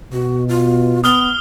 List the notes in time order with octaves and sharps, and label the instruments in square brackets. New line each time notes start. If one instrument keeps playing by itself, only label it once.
[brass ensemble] B2 [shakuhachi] F#4
[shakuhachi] F4
[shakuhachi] B3 [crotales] D#6 F6 G7